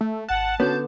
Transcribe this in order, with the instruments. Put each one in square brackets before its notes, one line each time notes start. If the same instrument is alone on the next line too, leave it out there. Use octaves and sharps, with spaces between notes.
[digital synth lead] A3
[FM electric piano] G#1 F#6 [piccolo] F#5 [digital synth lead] A5
[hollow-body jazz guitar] D3 B3 [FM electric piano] C#4 F#4 C#5 [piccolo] G6